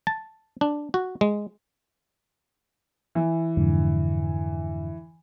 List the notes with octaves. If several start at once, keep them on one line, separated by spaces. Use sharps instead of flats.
A5
D4
F#4
G#3
E3
F2 G#2 D3